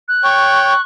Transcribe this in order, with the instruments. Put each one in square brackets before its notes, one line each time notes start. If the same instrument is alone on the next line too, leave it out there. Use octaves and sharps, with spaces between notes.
[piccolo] F#6
[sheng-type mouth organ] C#5 G5 [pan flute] C#6